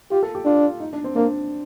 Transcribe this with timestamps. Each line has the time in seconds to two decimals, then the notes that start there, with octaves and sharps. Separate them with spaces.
0.11 F4 G4
0.23 A4
0.35 G4
0.46 D4 F4
0.80 D#4
0.93 D4
1.04 C4
1.16 A#3 D4